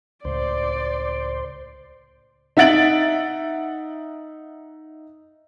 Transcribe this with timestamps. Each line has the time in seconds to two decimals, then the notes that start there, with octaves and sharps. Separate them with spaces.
0.25 C#2 A2 C5 D5
2.57 D#4 E5 F#5 A6 D7 F#7